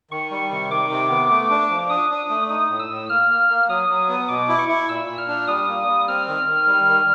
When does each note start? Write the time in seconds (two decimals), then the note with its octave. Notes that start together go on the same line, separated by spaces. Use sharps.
0.11 D#3 C#6
0.31 G3
0.51 C3
0.70 D#3 D6
0.90 C3
1.10 B3
1.30 A3
1.50 D4
1.70 F3
1.90 D4 D#6
2.10 D4
2.30 A3
2.49 D#4 D#6
2.69 A2
2.79 E6
2.89 A2
3.09 A#3 F6
3.29 A#3
3.49 A#3
3.69 F#3 D#6
3.89 F#3
4.08 B3
4.28 B2 D6
4.49 E4
4.58 C#6
4.68 E4
4.88 A#2 E6
5.08 A#2
5.18 F6
5.28 D4
5.48 G3 D#6
5.68 A#3
5.88 G3
6.08 C4 F6
6.27 D#3
6.47 D#3
6.67 G3
6.87 D#3